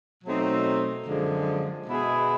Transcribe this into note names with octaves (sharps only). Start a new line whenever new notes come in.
B2 F#3 A3 C4 D#4
F#2 D3 F3 G#3
B2 G#3 B3 E4 G#4